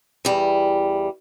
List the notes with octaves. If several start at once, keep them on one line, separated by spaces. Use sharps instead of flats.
E2 G3